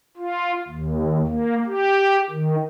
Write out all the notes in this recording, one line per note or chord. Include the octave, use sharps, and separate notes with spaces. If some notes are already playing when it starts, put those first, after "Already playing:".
F4
D#2
A#3
G4
D#3